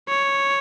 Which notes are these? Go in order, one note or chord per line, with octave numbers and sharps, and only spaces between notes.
C#5